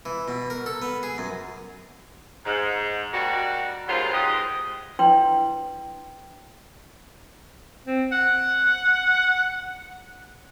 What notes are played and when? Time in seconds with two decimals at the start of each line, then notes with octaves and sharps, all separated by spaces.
0.05 E3
0.28 B2
0.50 A#4
0.66 A4
0.82 B3
1.03 G#4
1.18 F#2
2.45 G#2
3.14 G3 A#3 D4 F#4
3.88 D#2 G#2 F#3 B3 F4 C5
4.13 G#2 G4 B4 D#5
4.99 D4 E4 B4 G5 C6
7.87 C4
8.12 F#5